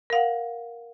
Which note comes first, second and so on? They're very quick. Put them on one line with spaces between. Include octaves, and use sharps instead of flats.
A#4 F5 F#5